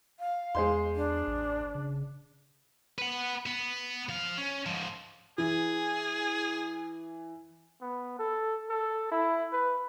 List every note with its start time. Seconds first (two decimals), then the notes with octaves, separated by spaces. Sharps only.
0.20 F5
0.55 E2 G#3 C5 C6
0.96 D4
1.27 A1
1.75 C#3
2.98 B4 F#5
3.46 B3
4.09 F3 F5
4.38 C#4
4.66 G#2 F3
5.38 E3 G#4
7.81 B3
8.19 A4
8.70 A4
9.12 E4
9.52 B4